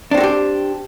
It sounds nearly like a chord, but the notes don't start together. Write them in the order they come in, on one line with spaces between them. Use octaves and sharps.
D4 C4 F#4 A4 G4